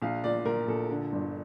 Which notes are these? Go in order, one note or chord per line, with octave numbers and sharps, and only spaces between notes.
A#1 F5
A#2 D5
A#2 A#4
A#1 A4
D3
G1